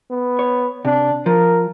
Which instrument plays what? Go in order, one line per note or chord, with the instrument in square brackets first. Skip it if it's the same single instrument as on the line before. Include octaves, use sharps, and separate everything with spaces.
[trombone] B3
[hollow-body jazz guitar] C#5
[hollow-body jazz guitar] C3 [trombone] D4
[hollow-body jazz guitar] F3 [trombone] A#4